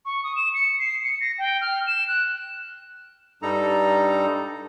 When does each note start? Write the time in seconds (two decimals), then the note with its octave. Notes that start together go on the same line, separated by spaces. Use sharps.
0.05 C#6
0.24 D#6
0.36 E7
0.54 C#7
0.79 C7
1.04 C#7
1.21 A#6
1.38 G5
1.61 F6
1.87 E7
2.08 F#6
3.42 G2 G3 D#4 A4 A#5